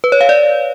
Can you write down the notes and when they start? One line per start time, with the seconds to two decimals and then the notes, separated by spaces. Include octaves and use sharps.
0.04 B4
0.12 C#5
0.21 F5
0.29 D5